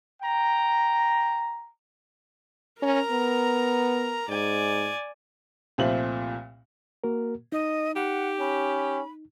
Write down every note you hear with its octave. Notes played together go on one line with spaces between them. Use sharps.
G5 A#5
C#4 A#4 A#5
B3
G#2 D5 G#5
C2 A#2 F3 A3 C4 F#7
A#3 F#4 A#4
D#4 D#5
G4 F#5
C#4 B5